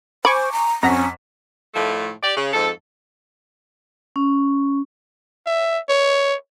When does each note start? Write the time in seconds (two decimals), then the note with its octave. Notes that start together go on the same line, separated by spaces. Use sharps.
0.25 C5 G#5 B5 C#6 D6
0.52 A#5
0.83 F2 C#4 F#5 A#5 B6
1.75 A2 D#3 F3 A3
2.22 G4 D5
2.36 C#3
2.53 F2 G#2 A4
4.16 C#4
5.46 E5
5.89 C#5